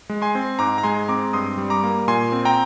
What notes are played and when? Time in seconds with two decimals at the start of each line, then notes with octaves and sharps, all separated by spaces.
0.09 G#3
0.22 G#5 C6
0.35 C4
0.59 G#2 A#5 D6
0.78 A#5
0.83 G#3 G#5 C6
1.08 C4 A#5 D6
1.33 G2 C6 D#6
1.58 G3
1.70 A#5 D6
1.84 A#3
2.08 A#2 G#5 C6
2.32 C4
2.45 G5 A#5